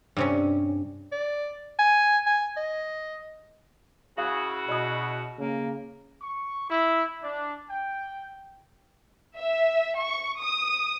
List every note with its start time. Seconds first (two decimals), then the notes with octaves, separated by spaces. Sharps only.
0.16 G2 C3 C#4
1.12 D5
1.79 G#5
2.26 G#5
2.57 D#5
4.18 C#3 E4 F#4 G#4 F5
4.69 B2 D5 D#5 D#6
5.38 C#3 A#3
6.22 C#6
6.70 E4
7.23 D4
7.70 G5
9.36 E5
10.01 C#6
10.41 D#6